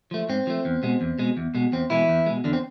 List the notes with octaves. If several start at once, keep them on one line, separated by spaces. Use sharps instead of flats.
F3 A3
G#2 C4
F3 A3
E2
B2 G#3
E2
B2 G#3
E2
B2 G#3
E2 C4
B2 E3 G#3 E4
E2
B2 G#3
E2 D3 D4
C4